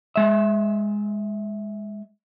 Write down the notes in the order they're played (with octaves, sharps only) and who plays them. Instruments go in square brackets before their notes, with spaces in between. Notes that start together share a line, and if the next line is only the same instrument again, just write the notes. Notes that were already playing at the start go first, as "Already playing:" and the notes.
[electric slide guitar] G#3 E5